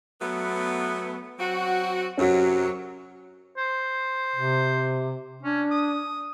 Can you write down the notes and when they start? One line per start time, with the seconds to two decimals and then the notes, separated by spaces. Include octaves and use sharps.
0.20 F#3 A3 B3
1.38 F#3 C4 F#4
2.18 F#2 C3 F#3 C#4 F#4
3.57 C5
4.36 C3
5.43 C#4 D4
5.71 D#6